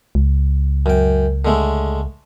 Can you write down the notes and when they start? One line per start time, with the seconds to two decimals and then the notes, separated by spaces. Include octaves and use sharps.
0.15 C#2
0.86 F#2 G5
1.45 D3 G#3 A3